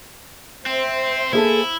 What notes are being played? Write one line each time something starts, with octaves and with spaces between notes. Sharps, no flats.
C4 C5 E5
A#3 E4 G#4 A4